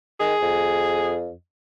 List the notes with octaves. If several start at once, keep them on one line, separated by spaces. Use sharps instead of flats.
D#3 G#4
F2